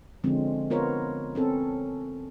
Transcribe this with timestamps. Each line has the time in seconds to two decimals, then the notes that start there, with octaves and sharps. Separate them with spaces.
0.24 D3 F3 G#3 C4 C#4
0.70 B3 F4 A#4 C5 C#5
1.35 C4 C#4 A4